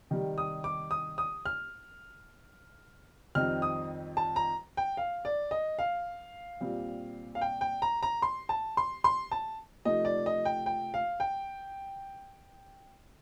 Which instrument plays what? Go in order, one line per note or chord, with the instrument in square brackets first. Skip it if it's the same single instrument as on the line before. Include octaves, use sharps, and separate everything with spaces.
[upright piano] C3 D#3 G3
D#6
D6
D#6
D#6
F6
F2 D#3 G3 C4 D#4 F6
D#6
A5
A#5
G5
F5
D5
D#5
F5
A#2 G3 C4
F5
G5
G5
A#5
A#5
C6
A5
C6
C6
A5
C3 F3 A3 D#4 D#5
D5
D#5
G5
G5
F5
G5